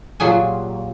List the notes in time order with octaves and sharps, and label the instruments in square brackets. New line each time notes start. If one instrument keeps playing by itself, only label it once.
[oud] A#2 G3 F4 [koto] F#3 G#4 G#5